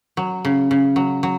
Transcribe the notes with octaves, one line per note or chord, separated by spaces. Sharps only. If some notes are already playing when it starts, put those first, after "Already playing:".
F#3
C#3
C#3
F#3
F#3